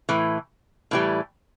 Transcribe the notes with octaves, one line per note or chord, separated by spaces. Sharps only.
A2 E3
A2 E3 G3